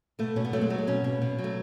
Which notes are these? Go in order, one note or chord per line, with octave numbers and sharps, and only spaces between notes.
B2 A3
B2 C#4
B3
F#3 A3
G#3
F#3 A3
G#3
B2 C#4
B2
B2
F#3
A3